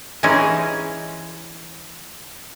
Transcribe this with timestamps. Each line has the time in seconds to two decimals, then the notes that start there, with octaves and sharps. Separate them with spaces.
0.23 E3 G#3 C#4 D#4 G#4